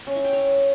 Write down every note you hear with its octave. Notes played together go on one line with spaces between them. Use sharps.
C#4
E4
G5
C#5